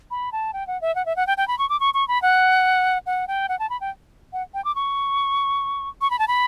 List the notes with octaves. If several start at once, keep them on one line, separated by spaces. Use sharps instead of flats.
B5
A5
G5
F#5
E5
F#5
E5
F#5
G5
G5
B5
C#6
D6
C#6
C#6
B5
F#5
F#5
G5
F#5
A5
B5
G5
F#5
G5
D6
C#6
C#6
B5
A5
B5